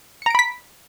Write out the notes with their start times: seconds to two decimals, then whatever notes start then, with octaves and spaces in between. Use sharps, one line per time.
0.22 C#7
0.26 A#5
0.30 D7
0.35 B5
0.39 B6